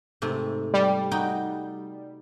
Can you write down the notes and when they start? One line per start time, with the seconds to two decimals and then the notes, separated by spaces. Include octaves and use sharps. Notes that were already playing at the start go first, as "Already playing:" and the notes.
0.22 G#2 C3 A3
0.74 G3
1.11 D#4 F#4 G5